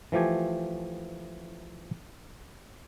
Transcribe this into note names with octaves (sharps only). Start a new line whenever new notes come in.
E3 F3 A3 G4 G#5